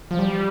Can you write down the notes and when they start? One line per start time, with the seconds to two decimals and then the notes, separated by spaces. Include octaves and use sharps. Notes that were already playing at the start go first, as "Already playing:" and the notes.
0.11 F3
0.19 G3